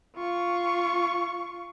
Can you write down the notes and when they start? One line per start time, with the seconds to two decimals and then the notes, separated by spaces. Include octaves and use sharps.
0.16 F4 C#6